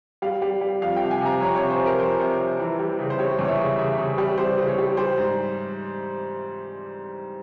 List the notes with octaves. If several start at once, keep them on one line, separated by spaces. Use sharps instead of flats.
G3 F5
G3
G3
F2 F5
G5
C3
G#5
C3
A#5
F2 C#5
C#5
C3
C5
C3
A#4
F2 C5
C3
C3
E3
G3
C#3
C5
G3 C#5
E2
C#5
E5
C#3
C#3 E5
C#3
G3
G3 C5
C#3
C#5
G3
G3 C5
G#2